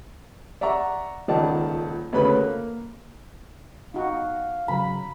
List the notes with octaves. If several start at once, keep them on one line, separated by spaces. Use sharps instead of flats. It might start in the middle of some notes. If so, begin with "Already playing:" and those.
D5 E5 F#5 A#5 C#6
D#1 C#2 D#3 D5 F#5 A5
D2 C#3 B4 C#5 B5
A#3
D#4 F#4 F5
G#2 C#3 F#3 B5